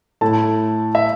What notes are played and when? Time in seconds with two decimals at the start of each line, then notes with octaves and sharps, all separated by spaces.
0.21 A2 A3 E4 A5
0.95 E5